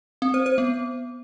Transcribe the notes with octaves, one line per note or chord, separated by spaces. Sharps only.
C4
C5
C5
B3